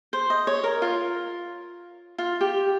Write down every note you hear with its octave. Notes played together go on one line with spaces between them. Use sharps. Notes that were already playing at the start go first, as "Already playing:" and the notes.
C5
D#5
C#5
A#4
F4
F4
G4